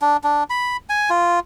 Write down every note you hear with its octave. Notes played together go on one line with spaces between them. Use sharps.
D4
D4
B5
G#5
F4